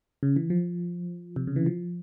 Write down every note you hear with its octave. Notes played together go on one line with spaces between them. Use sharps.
C#3
E3
F3
C3
C#3
E3
F3